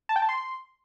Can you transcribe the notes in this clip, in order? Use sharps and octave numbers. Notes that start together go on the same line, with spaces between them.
A5
G5
A5
C6